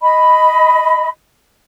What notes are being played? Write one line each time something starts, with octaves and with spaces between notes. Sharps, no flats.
D#5 B5